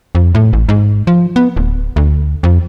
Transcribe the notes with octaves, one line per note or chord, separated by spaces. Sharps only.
F2
A2
A1
G#2
F3
B3
D1
D2
F2